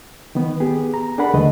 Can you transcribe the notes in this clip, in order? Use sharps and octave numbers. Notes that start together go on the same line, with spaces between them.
D#3 B3
B3 G4 G#4
A#5
D4 G#4 A#4 F#5 B5
D#2 D3 A3 B4 D#5